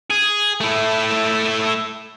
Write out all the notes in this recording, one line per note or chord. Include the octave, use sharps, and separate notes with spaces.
G#4
A3 E4